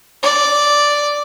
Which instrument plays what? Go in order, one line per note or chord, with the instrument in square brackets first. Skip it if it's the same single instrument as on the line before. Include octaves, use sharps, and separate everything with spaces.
[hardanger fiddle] D5